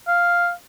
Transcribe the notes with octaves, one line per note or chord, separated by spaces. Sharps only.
F5